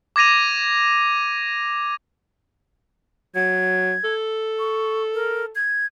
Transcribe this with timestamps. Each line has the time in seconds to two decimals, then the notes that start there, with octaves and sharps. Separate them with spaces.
0.16 D6 G#6 A#6 D#7 F7
3.35 F#3 G#6
4.04 A4
4.59 C#6
5.14 A#4
5.55 G#6